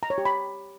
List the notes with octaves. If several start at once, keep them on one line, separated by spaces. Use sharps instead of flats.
A#5
C#5
G4
B5